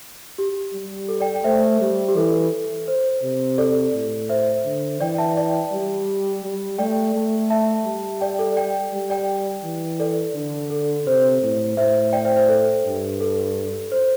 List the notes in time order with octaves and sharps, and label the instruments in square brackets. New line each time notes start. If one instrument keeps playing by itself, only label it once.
[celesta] G4
[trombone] G3
[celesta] A4
D5 G5
G5
[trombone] A3 [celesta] C5 E5
[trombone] G3
[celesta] G4
[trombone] E3 [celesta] A4
[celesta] C5
[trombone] C3
[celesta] A4 D5
[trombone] A2
[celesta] C5 E5
[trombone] D3
[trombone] E3 [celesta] D5 G5
[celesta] E5 A5
D5 G5
[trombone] G3
G3
[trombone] A3 [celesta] D5 G5
[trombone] A3
[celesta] E5 A5
[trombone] G3
[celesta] D5 G5
A4 D5
D5 G5
[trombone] G3
[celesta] D5 G5
[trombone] E3
[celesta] A4 D5
[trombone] D3
[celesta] A4
[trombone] C3 [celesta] C5
[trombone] A2
[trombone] A2 [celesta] C5 E5
[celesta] D5 G5
C5 E5
C5
A4
[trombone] G2
[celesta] A4
C5